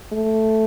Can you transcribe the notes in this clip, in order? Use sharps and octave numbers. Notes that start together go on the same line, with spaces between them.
A3